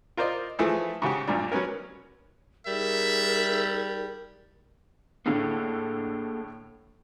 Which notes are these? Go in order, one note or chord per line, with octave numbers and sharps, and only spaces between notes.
F4 A#4 C5 D5 D#5
E3 F3 A3 E4 G#4 A4
G#2 C#3 F#4 G4
B1 G2 A#2 D4
F#3 B3 C#4 A#4
G3 D#4 G#4 A#4 E5
A2 D3 A#3 G#4 A4